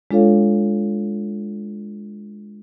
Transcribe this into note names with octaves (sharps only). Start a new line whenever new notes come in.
G#3 D4 F4 A4 C#5 F5